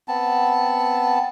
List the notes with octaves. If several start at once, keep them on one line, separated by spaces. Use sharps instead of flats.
B3 C4 A5